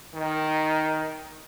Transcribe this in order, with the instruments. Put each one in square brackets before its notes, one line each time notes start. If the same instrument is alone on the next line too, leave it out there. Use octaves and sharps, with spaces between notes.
[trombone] D#3